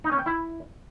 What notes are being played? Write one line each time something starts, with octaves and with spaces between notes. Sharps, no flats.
D#4
C#4
G5
E4